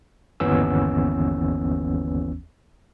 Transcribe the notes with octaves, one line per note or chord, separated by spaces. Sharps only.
G1 D#2 E3 B3 C#4 E6